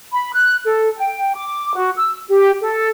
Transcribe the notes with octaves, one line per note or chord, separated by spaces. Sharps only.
B5
F#6
A4
G5
D6
F#4
E6
G4
A4